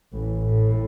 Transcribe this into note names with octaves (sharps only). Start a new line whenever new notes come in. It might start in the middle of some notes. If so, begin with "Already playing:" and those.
A1 A2
A2